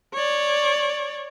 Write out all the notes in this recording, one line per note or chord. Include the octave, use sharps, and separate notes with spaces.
C#5 D5